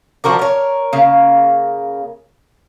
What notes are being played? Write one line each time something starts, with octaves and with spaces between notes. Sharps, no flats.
F3 F#4 A#4 D5
A#4 C#5
C#3 A#3